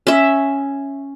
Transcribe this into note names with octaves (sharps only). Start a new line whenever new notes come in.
C#4 E5